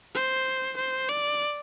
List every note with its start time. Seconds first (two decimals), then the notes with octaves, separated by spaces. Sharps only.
0.15 C5
0.77 C5
1.09 D5